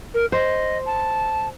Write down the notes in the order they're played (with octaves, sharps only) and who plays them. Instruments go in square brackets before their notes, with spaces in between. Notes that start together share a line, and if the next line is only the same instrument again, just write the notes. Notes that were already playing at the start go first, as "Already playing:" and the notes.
[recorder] A#4
[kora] C5 [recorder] D#5
[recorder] A5